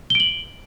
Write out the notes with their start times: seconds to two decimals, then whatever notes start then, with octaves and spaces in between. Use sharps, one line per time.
0.10 G7
0.15 D7
0.20 F#7